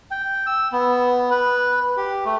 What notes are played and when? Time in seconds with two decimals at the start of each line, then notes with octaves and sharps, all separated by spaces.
0.11 G5
0.46 E6
0.72 B3
1.31 B4
1.97 G4
2.25 A3